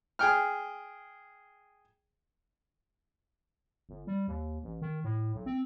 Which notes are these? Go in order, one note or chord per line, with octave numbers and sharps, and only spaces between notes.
G#4 G5 F6
G1
G3
D#2
A1
D#3
A2
B1
C4